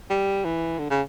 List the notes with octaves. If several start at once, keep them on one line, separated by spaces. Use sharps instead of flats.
G3
E3
D3
C#3